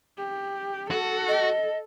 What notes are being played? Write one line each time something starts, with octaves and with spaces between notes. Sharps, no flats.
G4
F#4 A4
D#5